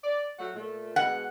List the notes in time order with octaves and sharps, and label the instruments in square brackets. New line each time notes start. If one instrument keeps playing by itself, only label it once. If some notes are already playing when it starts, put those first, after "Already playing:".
[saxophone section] D5
F#3 A3 F#4
A#2 A3
[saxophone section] B2 G#3 [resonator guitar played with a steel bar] F#5